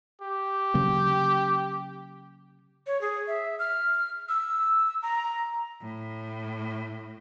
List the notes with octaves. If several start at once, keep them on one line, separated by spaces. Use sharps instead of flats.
G4
C#3 F#3 A#3
C#5
G#4
E5
F6
E6
A#5
A2